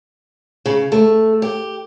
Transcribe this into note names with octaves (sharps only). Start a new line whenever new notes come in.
C#3
A3
G4